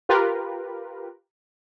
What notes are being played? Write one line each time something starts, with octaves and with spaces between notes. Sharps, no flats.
F4 G4 A#4 B4